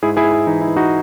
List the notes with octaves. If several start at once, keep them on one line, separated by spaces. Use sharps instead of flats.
G#2 E4 G#4
E4 G#4
G#2
E4
E3 D#4
E4
E3
D#4 F#4